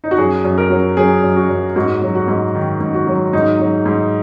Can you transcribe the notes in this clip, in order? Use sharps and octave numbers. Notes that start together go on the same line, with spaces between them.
D#4
F#4
F#2 G#4
F#2
A#4
F#3
F#3 G#4
F#2
F#4
F#2
G#2 F#4
F#3
F#4
G#2
D#3
G#2
F#4
F#3
G#2 D#4
F#3
G#2